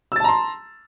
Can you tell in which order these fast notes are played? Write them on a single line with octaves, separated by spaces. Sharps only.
E6 A6 A5 A#5 C6